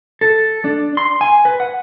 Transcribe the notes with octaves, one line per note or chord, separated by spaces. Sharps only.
A4
D4
C6
G#5
B4
F#5